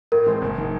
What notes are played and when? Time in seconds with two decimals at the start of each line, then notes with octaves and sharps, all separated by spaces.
0.12 A2 A#4
0.26 E3 G#3 C4
0.42 F#1
0.58 D#3